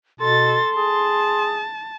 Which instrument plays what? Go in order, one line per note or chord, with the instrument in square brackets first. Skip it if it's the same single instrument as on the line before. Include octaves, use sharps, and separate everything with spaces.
[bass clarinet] B2 [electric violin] A4 A6 [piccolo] C6
[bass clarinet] G#4 [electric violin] A5